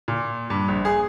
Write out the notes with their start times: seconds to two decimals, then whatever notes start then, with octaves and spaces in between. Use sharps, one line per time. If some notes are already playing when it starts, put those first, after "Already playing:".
0.08 A#2
0.50 G2
0.68 A#1
0.85 G#4